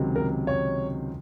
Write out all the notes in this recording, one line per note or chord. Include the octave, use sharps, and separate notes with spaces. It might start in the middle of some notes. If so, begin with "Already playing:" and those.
Already playing: C#2 C3 D#3 F#3
A#4
C#5